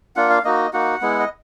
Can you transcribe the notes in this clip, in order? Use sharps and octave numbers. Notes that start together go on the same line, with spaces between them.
A#3 D4 F4 F#5
F5
A#3 D#4 F#4 D#5
A#3 D#4 F#4 F#5
G#3 B3 E4
D#5